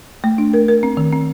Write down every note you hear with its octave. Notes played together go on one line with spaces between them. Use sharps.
A3
D4
A#4
A#4
C4
D#3
C4